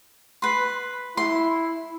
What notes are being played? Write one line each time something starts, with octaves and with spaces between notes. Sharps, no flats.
B4 C6
E4 C6